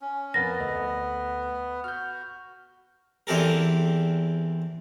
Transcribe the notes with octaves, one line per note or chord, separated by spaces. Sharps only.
C#4
F2 B3 A#4 A6 A#6
D2 A4 D#5
F#4 F6 G6
E2 E3 C4 G4 A4 A#4